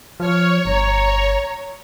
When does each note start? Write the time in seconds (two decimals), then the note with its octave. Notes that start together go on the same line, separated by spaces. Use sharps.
0.20 F3 C#5 F6
0.65 G1 A#5